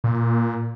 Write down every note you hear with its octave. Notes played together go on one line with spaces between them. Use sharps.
A#2